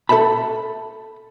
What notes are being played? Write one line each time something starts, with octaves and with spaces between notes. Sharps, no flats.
A4 C5 E5 A5 B5